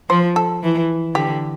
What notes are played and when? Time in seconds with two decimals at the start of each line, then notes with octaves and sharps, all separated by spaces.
0.10 F3 C5
0.36 A4
0.63 E3
1.15 D3 G4